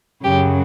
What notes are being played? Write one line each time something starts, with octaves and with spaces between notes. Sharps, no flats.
F#2 C#3 F#3 G4